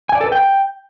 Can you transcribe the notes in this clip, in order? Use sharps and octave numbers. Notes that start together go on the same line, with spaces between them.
G#5
D5
A4
B4
G5